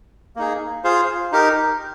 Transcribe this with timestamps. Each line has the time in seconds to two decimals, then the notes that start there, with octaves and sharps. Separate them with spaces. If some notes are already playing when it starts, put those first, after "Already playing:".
0.36 A#3 D#4 G#4
0.84 F4 G#4 C5 F5
1.32 D#4 G4 A#4